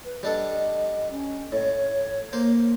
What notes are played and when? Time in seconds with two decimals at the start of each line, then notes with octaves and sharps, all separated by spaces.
0.04 B4
0.23 G3 D4 A4 D#5
1.11 C#4
1.52 A2 C#5
2.33 A#3 C5